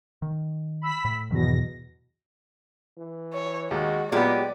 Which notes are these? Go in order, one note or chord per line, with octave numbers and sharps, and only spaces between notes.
D#3
B5 E6 B6
A2
E2 G#2 B2 D#3 F#3 A#6
E3
C#5
D#2 G#3 F#4
A#2 F#3 G#3 B3 G4 D5